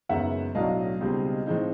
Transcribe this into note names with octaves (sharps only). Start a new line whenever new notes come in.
F#1 F#2 D#3 G#3 B3 E5 F#5
B1 A2 F#3 A3 D4 D#5 F5
C#2 B2 G3 C4 D#4
A2 F3 G#3 C4 D#4